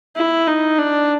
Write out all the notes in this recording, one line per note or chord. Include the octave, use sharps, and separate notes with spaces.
E4
D#4
D4